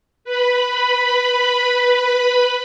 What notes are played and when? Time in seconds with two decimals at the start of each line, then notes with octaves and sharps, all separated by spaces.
0.24 B4 B5